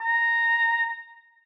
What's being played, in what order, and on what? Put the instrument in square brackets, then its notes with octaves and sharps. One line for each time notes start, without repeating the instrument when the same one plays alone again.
[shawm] A#5